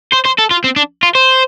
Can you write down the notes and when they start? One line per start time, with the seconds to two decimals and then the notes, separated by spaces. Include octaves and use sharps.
0.12 C5
0.25 C5
0.38 A4
0.51 F4
0.64 C4
0.76 D4
1.03 F4
1.15 C5